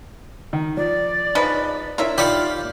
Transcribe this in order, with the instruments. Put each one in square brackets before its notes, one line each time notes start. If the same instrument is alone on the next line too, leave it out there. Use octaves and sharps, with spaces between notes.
[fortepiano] D#3
[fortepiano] F3 [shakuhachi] D5
[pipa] C#3 F3 B4 [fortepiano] D#4
[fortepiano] D4 E4 C#5 [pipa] F4 A#4 E5
[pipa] D#3 G4 [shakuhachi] F4 [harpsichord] D5 B5